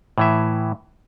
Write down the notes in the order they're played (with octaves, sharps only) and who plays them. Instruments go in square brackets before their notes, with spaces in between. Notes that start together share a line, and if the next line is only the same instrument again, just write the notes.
[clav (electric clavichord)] A2 E3 E5